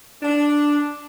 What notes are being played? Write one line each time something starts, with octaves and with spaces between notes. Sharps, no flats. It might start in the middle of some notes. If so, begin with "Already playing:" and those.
D4